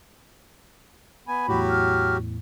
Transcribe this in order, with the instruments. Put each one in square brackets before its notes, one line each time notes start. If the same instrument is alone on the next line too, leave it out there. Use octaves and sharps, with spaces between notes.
[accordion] B3 G#5 [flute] B5
[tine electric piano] E2 A2 [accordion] F#3 F#4 G4
[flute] F6